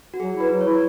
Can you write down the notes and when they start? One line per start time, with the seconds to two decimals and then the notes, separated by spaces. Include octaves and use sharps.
0.14 F#4
0.20 F#3 G#4
0.35 E4
0.40 B4
0.51 F#3
0.61 C#5
0.66 E4